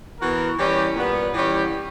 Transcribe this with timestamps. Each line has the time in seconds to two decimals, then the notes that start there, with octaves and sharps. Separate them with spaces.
0.20 E3 B3 F#4 A#4
0.58 E3 G3 C#4 G4
0.96 A#2 G3 B3
1.34 E3 G3 C#4 G4